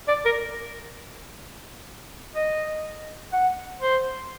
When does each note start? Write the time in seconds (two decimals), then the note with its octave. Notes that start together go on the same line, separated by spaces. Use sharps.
0.08 D5
0.25 A#4
2.36 D#5
3.33 F#5
3.81 C5